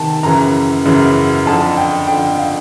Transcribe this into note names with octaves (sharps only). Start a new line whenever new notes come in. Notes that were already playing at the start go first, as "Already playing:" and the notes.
Already playing: C3 D#3 G5 A5
F#2 C#3 E3 A#5
F#2 C#3 E3
F2 D3 A5
G5
F2 D3 G5
F5